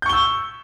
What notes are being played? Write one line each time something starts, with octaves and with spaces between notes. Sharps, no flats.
C#6 E6 G6 G7